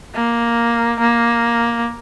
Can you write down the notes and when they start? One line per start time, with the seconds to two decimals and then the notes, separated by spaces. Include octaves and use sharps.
0.15 A#3
1.00 A#3